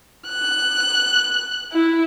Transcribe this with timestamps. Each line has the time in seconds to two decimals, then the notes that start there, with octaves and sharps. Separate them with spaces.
0.28 F#6
1.72 E4